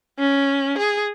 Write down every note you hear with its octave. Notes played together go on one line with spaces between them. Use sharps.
C#4
G#4